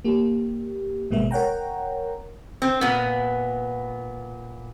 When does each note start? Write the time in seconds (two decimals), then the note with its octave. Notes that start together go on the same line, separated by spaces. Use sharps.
0.04 A#3 G4
1.10 G#1 B2 G#3 A#3 B3 E5
1.31 A#4 C#5 F#5 G5 A#5
2.62 C4
2.81 A#2 B3